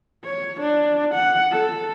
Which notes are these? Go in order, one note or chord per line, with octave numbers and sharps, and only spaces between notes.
C#5
D4
F#5
A4